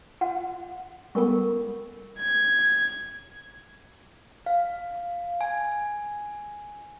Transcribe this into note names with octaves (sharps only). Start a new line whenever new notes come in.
F4 F#5
G3 G#3 B3 A4 A#4 C#6
G#6
F5
G#5